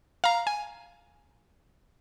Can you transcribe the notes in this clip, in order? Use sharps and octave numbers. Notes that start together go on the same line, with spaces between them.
F5 A#5
G#5